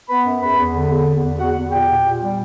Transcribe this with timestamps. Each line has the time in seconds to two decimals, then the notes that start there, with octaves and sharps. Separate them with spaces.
0.09 B3 B4 B5
0.25 F#2
0.42 E2 B4 B5
0.58 E2
0.74 D3
0.90 E2
1.07 E2
1.23 E2
1.39 E2 F#4 F#5
1.56 E2
1.72 A#2 G4 G5
1.89 A#2
2.05 A#2
2.21 G3